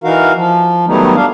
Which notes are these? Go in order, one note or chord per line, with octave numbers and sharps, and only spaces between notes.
E3 D#4 F#4 A#4 F5
F3
D#3 F#3 G3 A3 B3 D#4
D4 F5